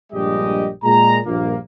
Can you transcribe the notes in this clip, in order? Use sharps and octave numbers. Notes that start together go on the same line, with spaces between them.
A#1 G2 G3 G#3 G4 D#5
A#2 G#3 A#5
A#1 G2 A#2 A#3